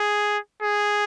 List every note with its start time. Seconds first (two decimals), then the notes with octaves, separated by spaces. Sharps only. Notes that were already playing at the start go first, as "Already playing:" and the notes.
Already playing: G#4
0.62 G#4